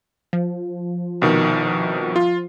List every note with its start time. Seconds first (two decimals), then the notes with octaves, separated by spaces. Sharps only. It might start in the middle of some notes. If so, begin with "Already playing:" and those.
0.33 F3
1.22 C2 B2 D#3
2.16 F4